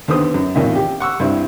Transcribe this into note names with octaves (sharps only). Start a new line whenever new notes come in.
D#2 D3 B3 C5 D#6
F#2
A1 F2 A#2 D#3 D#5 E5
G4
F#5 C#6 E6
C2 G2 E4 C5 E5